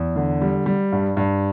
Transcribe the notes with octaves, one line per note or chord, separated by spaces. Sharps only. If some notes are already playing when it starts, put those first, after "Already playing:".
Already playing: E2
D3
G3
G3
G2
G2